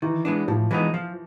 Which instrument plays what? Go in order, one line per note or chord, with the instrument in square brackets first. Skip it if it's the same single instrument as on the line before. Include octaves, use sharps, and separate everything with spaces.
[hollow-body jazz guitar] D#3 [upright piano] E3
[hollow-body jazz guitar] G#3 B3 D4
[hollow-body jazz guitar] A2 [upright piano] F3
[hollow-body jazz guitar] E3 G#3 B3 D#4
F3